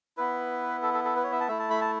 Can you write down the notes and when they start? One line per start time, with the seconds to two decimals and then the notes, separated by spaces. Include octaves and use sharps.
0.17 B3 E4 B4
0.82 A4
0.94 A4
1.04 A4
1.16 B4
1.24 C#5
1.32 E5
1.40 A5
1.48 A3 E4 E5
1.59 A5
1.70 B5
1.82 A5